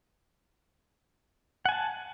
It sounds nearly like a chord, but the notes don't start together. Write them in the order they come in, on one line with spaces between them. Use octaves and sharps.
F#5 G#5 A5